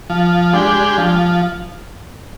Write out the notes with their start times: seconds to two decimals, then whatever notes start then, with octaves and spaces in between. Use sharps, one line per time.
0.10 F3
0.53 G#3 D4 G4
0.98 F3